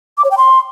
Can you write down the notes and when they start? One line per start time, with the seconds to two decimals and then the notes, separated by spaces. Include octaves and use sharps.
0.18 D6
0.24 C#5
0.31 G5
0.38 C6